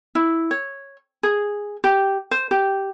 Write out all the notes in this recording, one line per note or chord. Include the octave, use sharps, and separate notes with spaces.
E4
C#5
G#4
G4
C5
G4